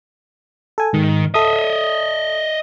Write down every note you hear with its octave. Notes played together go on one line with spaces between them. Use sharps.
A4 G#5
G#2 D#3
A4 D#5 E5 D#6